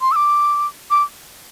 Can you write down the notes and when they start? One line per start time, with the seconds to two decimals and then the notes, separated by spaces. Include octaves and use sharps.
0.01 C6
0.12 E6
0.16 D6
0.91 D6